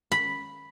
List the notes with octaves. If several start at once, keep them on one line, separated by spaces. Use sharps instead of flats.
B5